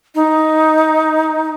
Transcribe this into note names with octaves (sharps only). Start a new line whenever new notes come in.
D#4